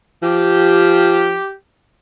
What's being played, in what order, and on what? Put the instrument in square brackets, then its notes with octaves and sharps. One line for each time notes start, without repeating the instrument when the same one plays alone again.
[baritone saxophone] F3 [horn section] G4